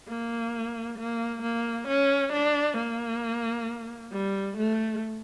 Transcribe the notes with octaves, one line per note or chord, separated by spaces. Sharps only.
A#3
A#3
A#3
C#4
D4
A#3
G3
A3